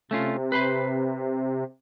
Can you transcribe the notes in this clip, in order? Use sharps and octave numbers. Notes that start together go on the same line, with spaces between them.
C3 A3 C#4 F4
B4 C5 B5